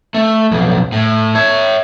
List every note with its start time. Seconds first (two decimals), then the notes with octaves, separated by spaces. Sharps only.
0.14 A3
0.51 B1 F2
0.92 A2
1.35 C#5 E5